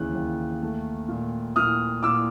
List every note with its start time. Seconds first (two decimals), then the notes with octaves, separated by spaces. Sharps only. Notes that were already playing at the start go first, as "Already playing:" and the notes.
Already playing: D#2 C#3 E3 F#6
0.14 D#2
0.62 A3
1.08 A#2
1.56 A#2 D#6 F6
2.03 A#2 D6 E6